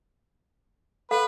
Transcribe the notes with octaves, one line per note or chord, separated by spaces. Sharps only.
A4 B4 F5